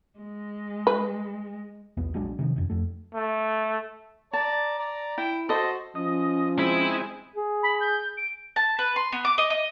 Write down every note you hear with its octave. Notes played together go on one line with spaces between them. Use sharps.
G#3
B4
B1 E2 B3
A#1 F#3 G#3 D4
C3 D#3 F3
E1 F#2
F2 A3
A3
D5 A5 A#5
D5 A#5
E4 G5
F#4 A4 C5 D#5
F3 C#4 D#5
G#3 C4 E4 G#5
G#4
B5
G6
D7
A5
B4
C6
B3
D6
D#5
D#5